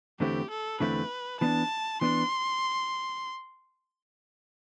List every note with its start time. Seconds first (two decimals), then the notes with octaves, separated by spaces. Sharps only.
0.20 E2 D3 A3 C4 E4 G4
0.50 A4
0.80 E2 D3 A3 C4 E4 B4
1.41 E3 B3 D4 A5
2.01 E3 B3 D4 C6